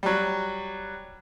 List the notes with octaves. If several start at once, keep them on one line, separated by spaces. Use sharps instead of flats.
F#3 G3